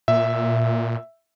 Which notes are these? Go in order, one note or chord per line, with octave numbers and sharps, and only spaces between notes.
A#2 E5